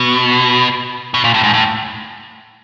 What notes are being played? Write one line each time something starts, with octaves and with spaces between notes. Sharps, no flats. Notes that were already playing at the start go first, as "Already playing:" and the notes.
Already playing: B2
B2
A#2
A2
G#2
A2